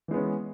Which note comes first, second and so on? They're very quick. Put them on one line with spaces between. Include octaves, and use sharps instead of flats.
E3 G#3 B3 C#4